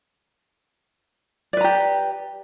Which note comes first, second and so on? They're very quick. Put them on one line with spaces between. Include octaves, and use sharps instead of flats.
D5 B4 A#5 G4